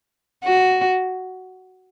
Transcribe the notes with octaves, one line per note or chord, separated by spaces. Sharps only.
F#4